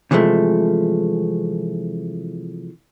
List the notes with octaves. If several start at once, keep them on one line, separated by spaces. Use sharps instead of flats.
C3 E3 F3 G#3 A3